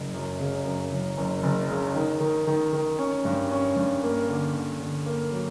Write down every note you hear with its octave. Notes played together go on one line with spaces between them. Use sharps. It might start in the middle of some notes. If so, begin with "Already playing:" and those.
Already playing: F#1
F#2
C#3
F#2
F#1
F#1
F#1
C#3
D#3
D#3
D#3
D#3
C#4
G2
C#4
G2
A#3
D3
D3
D3
A#3
F#3